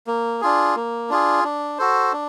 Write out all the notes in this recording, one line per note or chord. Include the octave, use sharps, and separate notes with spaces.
A#3
D4 F4 G#4
A#3
D4 F4 G#4
D4
F#4 A4 C5
D4